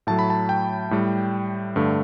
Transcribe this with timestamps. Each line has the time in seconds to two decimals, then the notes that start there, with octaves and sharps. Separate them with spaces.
0.07 A2 F#3 A3 A5
0.19 B5
0.30 A5
0.49 G5
0.91 A2 G3
1.76 G2 D3 A3